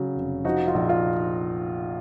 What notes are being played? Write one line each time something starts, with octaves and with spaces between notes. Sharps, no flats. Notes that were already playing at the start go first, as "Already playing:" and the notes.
Already playing: C#3 F#3
F1
F3 D#4 F#4
F4
A#1
F4